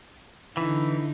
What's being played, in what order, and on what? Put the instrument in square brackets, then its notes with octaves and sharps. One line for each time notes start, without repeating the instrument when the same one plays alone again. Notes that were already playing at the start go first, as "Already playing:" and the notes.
[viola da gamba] D3 D#4 [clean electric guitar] E3 [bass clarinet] E4